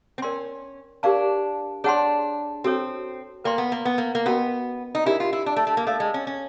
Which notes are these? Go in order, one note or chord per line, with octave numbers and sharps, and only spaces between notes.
C4
C#4 A#4 D5 G5 C6
D4 G4 A#4 D5 F5 A5
D4 G#4 C#5 F#5 A5 C6
C4 F#4 A4 C#5
A#3 B4 D5 G5 C6
B3
A#3
B3
A#3
A#3
B3 C#4 F#4 A#4 D#5 G5
D#4
D4 E4 G4 A#4 D5
F4
E4
D4
A3
A3
A#3
A3 A4 D5 F5
G#3
C#4
C#4